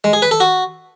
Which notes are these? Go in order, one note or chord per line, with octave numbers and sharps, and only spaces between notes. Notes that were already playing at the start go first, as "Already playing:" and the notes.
G#3
G#4
B4
A4
F#4